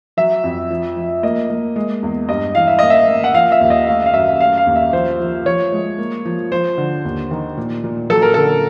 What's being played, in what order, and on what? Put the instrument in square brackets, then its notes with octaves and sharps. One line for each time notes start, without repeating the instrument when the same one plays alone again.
[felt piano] F#3 [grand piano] E5
[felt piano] F2
F3
F3
[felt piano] A#3 [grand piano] D#5
[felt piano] A#3
G#3
E2
[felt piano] G2 [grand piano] D#5
[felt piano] E3 [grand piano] F5
[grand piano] E5
[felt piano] A#3 [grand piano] D#5
[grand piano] E5
[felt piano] A#3
[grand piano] F#5
[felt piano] F3 [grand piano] F5
[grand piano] E5
[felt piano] D#2
[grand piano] D#5
[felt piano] A3 [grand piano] F5
[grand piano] F5
[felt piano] F#2 [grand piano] E5
[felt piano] A3 [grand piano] F5
[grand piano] F5
[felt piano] D#2
[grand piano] E5
[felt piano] F3 [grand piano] C5
[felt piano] F3
[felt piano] F3 [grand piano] C#5
[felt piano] G#3
A#3
F3
[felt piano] F3 [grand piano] C5
[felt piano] D3
D#2
D#3
A#2
A#2
[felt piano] F#3 [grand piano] A4
[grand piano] A#4
[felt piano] D3 [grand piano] A4